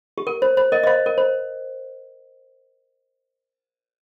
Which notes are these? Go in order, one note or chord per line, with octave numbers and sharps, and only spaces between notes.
G4
A#4
C5
C5
A#4 D#5
D#5
C5 F5
A#4
C5